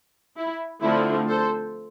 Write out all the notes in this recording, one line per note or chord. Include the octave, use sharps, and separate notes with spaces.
E4
D3 F3 A3 C4 E4
A4 C5